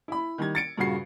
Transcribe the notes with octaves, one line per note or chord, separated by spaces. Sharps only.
E4 B5
D#3 G3 G#6
A6 C#7 D7
G2 A#2 C#3 F#4 C7